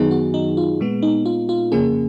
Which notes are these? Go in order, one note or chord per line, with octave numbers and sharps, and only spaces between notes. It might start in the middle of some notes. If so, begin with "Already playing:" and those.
Already playing: F#2 D#3 F#3 B3 D#4 G#4
F#4
D#4
F4
A#2 G#3 B3
D#4
F4
F4
F2 C#3 F3 A#3 C#4 G#4